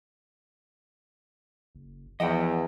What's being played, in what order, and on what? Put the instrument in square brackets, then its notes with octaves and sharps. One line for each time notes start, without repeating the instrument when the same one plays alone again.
[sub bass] F#1
[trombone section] E2 [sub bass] F3 [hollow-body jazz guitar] D#5 F#5 G5